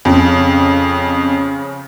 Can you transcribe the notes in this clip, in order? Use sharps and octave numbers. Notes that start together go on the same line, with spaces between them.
F2 C#3